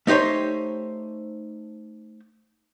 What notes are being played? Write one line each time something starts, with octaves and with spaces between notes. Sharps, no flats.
A3 D#4 G4 C5 C#5